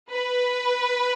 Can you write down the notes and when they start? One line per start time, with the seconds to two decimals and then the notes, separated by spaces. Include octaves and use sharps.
0.10 B4